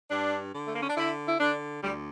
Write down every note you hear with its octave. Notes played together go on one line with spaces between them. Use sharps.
G2 D4
D3
A3
A#3
C#4
D4
D3 E4
E4
D3 D4
D2 G3